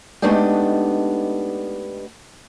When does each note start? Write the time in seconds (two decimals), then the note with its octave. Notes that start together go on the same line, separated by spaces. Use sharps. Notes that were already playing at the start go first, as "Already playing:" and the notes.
0.22 G#3 A3 B3 D4 D#4 G4